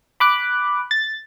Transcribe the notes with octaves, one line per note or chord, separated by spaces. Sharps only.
B5 D6 F#6
A6